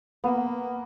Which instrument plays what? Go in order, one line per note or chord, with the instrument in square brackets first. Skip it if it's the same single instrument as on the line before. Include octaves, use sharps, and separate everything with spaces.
[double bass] A#3 [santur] B3